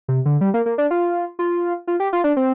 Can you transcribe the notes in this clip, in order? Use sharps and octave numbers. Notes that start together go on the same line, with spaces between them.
C3
D3
G3
A#3
A#3
D4
F4
F4
F4
G4
F4
D4
C4